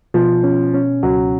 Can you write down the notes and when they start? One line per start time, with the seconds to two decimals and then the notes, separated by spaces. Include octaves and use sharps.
0.14 B2 F3
0.44 C#4
0.74 C#4
1.03 C#2 F#3